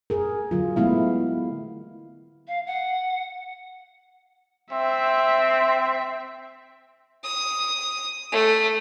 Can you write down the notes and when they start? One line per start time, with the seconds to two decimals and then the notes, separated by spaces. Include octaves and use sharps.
0.10 G#4 A#4
0.51 D3 F#3 F4
0.76 G#3 A3 B3 E4 F5
2.48 F5
2.67 F#5
4.72 C4 E5
7.23 D#6
8.32 A3